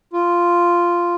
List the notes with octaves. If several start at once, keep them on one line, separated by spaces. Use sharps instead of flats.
F4